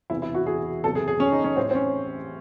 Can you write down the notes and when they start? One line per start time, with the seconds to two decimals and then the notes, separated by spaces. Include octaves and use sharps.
0.10 E1 E2 C3 E3 E4
0.22 E4
0.35 F#4
0.46 G#4
0.84 F#1 E2 C3 E3 A4
0.95 G#4
1.08 G#4
1.20 C#4
1.32 D#4
1.44 C#4
1.56 A1 A2 E3 C4
1.71 C4
1.75 C#4